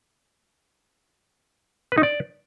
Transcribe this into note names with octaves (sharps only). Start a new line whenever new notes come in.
B4
D#4
D5